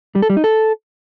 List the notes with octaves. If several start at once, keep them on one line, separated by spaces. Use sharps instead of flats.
G3
A4
G3
D#4
A4